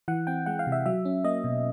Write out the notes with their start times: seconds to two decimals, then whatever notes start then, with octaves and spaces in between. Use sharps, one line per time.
0.08 E3 F#5
0.27 C4 G5
0.46 G#3 F#5
0.59 F5
0.67 C3
0.72 E5
0.86 F#3 E5
1.05 C#4
1.24 A#3 D#5
1.44 B2